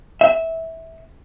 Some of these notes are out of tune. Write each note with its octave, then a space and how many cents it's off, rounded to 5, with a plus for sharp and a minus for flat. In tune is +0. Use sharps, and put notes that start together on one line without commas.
E5 -15